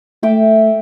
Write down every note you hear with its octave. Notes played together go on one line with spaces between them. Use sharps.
A3 E5 G5 D6